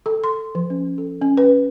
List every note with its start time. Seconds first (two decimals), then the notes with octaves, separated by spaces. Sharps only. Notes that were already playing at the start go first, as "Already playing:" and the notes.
0.06 A4
0.24 C6
0.55 F3
0.70 C#4
0.98 A4
1.22 C#4
1.37 B4